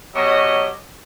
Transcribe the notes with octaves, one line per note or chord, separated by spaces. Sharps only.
B2 F#3 G4 C#5 D#5